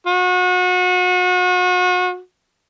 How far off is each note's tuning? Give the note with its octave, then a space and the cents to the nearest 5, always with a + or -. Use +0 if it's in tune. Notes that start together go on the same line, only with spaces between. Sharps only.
F#4 -35